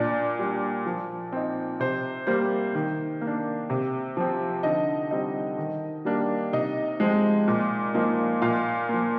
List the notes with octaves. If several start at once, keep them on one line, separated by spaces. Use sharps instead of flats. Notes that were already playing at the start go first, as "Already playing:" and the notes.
Already playing: A#2 D4 D5
G3 D4
F3
C4 D#4
C3 C5
G3 A#3 C5
D#3
A#3
D4
C3
F3 C4
D3 D#4 D#5
G3 C4 D#4
D#3
G3 A#3 D4
C3 D#4 D#5
F3 G#3 C4
A#2
F3 A#3 D#4
A#2 F4 F5
F3 A#3